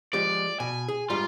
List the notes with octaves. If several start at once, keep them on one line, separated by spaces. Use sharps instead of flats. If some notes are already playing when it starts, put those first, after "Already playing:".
F3 G#3 G4 D5
B2 G#5
G#4
G#2 G3 F4